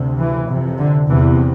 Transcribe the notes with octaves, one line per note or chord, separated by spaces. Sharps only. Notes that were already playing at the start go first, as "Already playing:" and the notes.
Already playing: D2 C3
E3
F2 C3
D3
E2 C3 E3